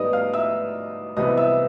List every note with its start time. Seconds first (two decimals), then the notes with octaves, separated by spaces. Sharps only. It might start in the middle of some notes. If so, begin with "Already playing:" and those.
Already playing: G#2 D#3 G3 B3 D5 D#5 D#6
0.13 F5 F6
0.34 E5 E6
1.17 C2 C3 E3 G3 B3 D#5 D#6
1.37 E5 E6